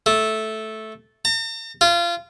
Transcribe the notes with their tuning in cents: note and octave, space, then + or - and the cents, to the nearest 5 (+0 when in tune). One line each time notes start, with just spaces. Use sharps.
A3 -10
A#5 -45
F4 -25